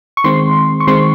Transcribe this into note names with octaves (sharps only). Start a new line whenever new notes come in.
C#6
D#3 G#3 C4 C6
C#6
D#3 G#3 C4 C6